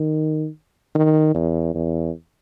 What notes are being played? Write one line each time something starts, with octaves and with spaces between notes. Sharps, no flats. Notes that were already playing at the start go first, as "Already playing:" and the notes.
Already playing: D#3
D#3
E2
E2